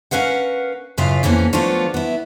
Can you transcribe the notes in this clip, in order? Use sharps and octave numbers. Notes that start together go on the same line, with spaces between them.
C#4 A#4 B4 F5 F#5
F#2 A2 C#3 F4 B4 F5
F2 E3 A#3 B3 C#4
F3 F#3 A3 B3 D4 F4
B3 E4